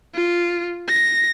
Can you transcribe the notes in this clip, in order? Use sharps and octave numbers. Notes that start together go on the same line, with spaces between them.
F4
A#6